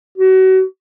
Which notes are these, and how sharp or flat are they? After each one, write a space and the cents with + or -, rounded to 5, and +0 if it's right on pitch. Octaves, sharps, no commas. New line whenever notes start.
F#4 +30